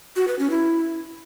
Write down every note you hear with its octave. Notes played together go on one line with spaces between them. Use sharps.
F#4
B4
C#4
E4